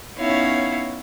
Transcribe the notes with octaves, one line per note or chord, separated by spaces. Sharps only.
B3 C#4 D#4 E4 C#5 F5